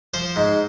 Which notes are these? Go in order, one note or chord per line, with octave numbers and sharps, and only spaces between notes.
F3 C5
G#2